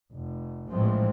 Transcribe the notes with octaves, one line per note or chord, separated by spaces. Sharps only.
F1
A#1 A2 E3 F3 G#3 C4